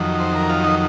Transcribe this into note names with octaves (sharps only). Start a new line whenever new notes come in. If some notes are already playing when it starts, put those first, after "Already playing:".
Already playing: F2 D#3 F#3
C5
A#4
F4
D#4